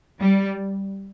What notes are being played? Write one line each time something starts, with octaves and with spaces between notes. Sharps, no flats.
G3